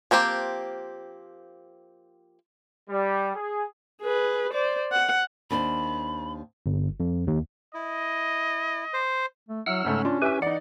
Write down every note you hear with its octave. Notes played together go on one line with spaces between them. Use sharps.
F3 A#3 C4 G4
G3
G#4
G#4 B4
C5 D5
F#5
D#2 D4 C5 B5
G1
F2
D#2
E4 D#5
C5
A3
F#3 E4 F#5 E6 F6
G#2 C#3 A3 C#4
D4 F4
E4 G4 B4 E5 G#5
E3 D#4 D5 F#5